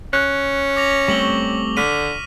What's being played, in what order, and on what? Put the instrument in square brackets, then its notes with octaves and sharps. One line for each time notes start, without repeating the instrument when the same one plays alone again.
[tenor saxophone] C#4 [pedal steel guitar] F#6
[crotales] D6 A#6 F7
[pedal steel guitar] G3 A3 C4 [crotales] C#6 F#7 G7
[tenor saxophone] D3 [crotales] F6 B6 D#7